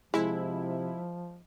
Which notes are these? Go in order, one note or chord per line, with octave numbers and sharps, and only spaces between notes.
C3 F3 G#3 E4